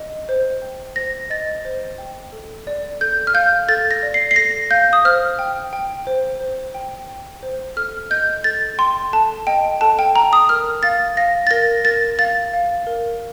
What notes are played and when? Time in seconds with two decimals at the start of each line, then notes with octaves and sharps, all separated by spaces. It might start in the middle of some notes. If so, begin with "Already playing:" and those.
Already playing: D#5
0.29 C5
0.62 G5
0.96 C5 A#6
1.30 D#5 A6
1.65 C5
1.98 G5
2.32 A4
2.67 D5
3.01 A4 G6
3.27 F6
3.34 F5 G6
3.69 A4 A6
3.91 A#6
4.03 D5
4.14 C7
4.31 C7
4.36 A4 A#6
4.71 F5 G6
4.93 D#6
5.05 C5 F6
5.39 G5
5.73 G5
6.07 C5
6.40 C5
6.74 G5
7.08 G5
7.43 C5
7.77 A4 F6
8.10 D#5 G6
8.44 A4 A6
8.78 G5 C6
9.13 A4 A5
9.47 D#5 G5
9.81 A4 A5
9.99 G5
10.15 G5 A#5
10.33 D#6
10.49 A#4 F6
10.83 F5 A6
11.17 F5 A#6
11.47 A6
11.51 A#4 A#6
11.85 A#4 A6
12.19 F5 A6
12.53 F5
12.87 A#4